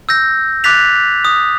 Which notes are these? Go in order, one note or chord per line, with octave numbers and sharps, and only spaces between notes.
E6 G6 A#6
D6 F#6 A6 B6 F7
D#6